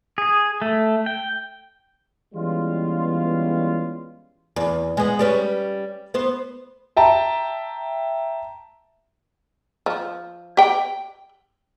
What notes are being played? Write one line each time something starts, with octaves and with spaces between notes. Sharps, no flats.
G#4
A3
G5
E3 G3 G#3 B3 C#4 F4
E2
G#3 B3
G3 C#4 B4
B3 C5
E5 G5 A5 A#5
F3
G4 G5